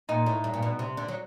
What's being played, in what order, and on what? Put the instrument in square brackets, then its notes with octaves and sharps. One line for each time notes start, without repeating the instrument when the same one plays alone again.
[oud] A#2 [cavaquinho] D#4
[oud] A2
G2
A#2
B2
C3
D3
F#3